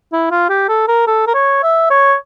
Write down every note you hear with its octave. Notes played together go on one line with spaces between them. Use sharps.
E4
F4
G4
A4
A#4
A4
A#4
C#5
E5
C#5